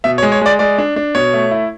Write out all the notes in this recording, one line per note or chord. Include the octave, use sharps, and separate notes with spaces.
B2 E5
C#5
G#3
C#5
G#3 D5
G#3 D5
D4
D4
B2 C#5
A3
E4